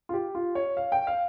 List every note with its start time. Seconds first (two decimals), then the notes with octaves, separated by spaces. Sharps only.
0.09 F4
0.13 G4
0.35 F4
0.55 C#5
0.77 F5
0.92 G5
1.07 F5